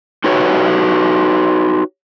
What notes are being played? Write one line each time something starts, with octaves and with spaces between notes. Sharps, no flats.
D#4 F#4 G4 B4 C#5